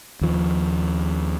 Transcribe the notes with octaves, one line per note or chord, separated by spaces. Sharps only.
D#2 F3